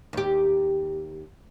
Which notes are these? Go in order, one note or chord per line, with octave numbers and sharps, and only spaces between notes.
D#2 G4